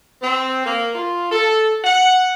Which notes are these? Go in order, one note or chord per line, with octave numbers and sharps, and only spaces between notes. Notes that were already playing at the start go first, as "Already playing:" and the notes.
C4
A#3
F4
A4
F#5